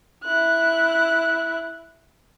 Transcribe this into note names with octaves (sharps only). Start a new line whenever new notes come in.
E4 F#6